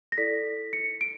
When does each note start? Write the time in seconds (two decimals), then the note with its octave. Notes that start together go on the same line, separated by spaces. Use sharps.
0.12 A#6
0.18 E4 A4 D5 B6
0.73 C#7
1.01 D7